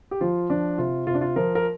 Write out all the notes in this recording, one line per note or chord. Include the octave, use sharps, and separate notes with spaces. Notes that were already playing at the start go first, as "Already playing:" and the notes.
G4
F3 F4
F3 D4
C3 F4
C3 F4
D4
F4
F3 A#4
A#4